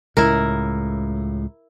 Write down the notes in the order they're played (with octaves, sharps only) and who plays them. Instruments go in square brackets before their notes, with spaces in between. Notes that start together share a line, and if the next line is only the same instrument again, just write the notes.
[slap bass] C#2 A2 [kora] E4 A#4